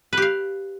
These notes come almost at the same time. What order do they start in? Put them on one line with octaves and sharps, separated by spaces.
B4 G4 F5